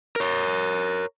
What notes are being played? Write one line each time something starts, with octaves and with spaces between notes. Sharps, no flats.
A#4 C#5